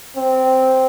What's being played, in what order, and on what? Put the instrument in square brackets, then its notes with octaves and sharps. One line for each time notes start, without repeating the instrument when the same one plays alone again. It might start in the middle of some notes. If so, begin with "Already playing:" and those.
[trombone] C4